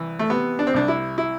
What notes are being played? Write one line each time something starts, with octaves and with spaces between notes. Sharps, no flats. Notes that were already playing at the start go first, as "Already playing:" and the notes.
Already playing: C2 E3
A3
C3 B3
D4
C4
C2 D4
E4
E4